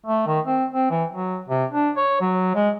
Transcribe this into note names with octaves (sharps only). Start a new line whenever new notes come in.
A3
D#3
C4
C4
E3
F#3
C3
D4
C#5
F#3
G#3